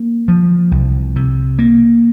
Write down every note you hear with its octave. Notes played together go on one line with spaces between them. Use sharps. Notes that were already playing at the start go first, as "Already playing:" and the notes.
Already playing: A#3
F3
C2
C3
A#3